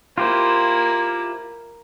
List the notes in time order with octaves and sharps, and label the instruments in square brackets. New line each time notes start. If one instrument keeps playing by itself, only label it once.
[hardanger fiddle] A#3 E4 [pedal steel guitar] F4 G4 C5